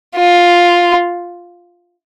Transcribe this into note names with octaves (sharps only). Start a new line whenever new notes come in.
F4